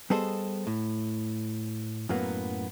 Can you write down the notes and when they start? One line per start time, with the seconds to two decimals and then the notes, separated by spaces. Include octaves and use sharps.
0.10 G3 B3 G#4 A4 C5 D#5
0.67 A2
2.09 F#2 A2 F#3 A#3 B3